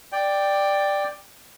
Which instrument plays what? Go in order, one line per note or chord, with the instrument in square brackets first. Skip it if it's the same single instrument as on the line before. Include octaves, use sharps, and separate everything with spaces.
[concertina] D5 G5